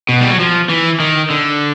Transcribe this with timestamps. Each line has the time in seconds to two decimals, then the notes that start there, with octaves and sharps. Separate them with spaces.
0.09 B2
0.21 G3
0.30 F#3
0.39 F3
0.69 E3
1.00 D#3
1.30 D3